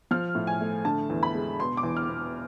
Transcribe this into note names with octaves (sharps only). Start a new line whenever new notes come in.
F3 F6
A2
G#5
A3
D3 A5
E2
B5
G#3
B2 C6
D6
E2
F6
B3